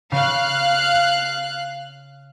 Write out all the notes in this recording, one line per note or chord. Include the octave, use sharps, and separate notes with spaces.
C#3 F5 F#6 C7